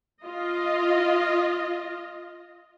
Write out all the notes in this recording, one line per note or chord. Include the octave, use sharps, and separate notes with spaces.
F4 D#5